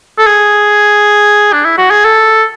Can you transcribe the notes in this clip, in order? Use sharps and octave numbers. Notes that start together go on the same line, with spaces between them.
A4
G#4
D4
E4
F#4
G#4
A4